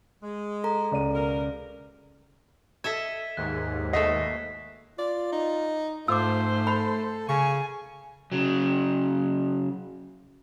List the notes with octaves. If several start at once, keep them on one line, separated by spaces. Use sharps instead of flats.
G#3
A4 A#5
C#2 D5 D#7
B2 A#4
A4 D#5 E5 G#6 B6
D#2 G#2 F#6
B2 A3 A4 D#5 B6 C7
F4 D5
D#4
G#2 A3 F4 C5 D6 E6
A4 B5
C#3 G#5 C#6
C#3 F#3